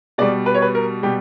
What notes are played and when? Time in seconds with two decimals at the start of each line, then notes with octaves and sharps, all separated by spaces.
0.18 B2 G3 D5
0.46 B4
0.55 C#5
0.62 B4
0.75 A#4
1.03 B2 G3 G4